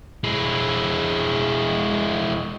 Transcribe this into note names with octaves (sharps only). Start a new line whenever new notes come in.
G#3 E4